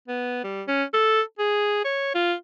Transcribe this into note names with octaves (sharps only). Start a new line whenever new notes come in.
B3
G3
C#4
A4
G#4
C#5
F4